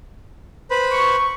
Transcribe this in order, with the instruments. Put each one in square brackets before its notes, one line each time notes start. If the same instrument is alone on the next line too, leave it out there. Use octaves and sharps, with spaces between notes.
[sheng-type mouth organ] B4 C5 B5
[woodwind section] C#6